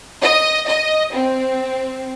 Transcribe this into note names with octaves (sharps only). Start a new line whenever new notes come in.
D#5
D#5
C4